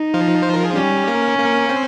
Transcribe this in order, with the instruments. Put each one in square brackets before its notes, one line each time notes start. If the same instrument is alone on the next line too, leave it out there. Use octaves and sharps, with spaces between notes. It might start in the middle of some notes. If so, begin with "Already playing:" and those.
Already playing: [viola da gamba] D#4
[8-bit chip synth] F3 F4
C5
A#4
G#4
[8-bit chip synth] G3 G4 [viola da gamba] C#4
[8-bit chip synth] A#3 A#4
A#3 A#4
C4 C5